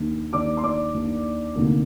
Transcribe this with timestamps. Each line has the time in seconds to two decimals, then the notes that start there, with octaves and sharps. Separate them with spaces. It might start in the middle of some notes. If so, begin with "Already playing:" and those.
Already playing: D#2 D#3 A#3 D4
0.33 D#2 D#3 A#3 D4 D5 D6
0.57 C6
0.64 D5 D6
0.94 D#2 D#3 A#3 D4
1.55 D2 C3 D#3 A#3 D4